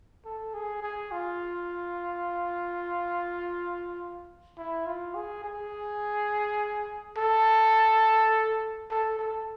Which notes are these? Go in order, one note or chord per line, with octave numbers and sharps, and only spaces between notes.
A4
G#4
G#4
F4
E4
F4
G#4
G#4
A4
A4
A4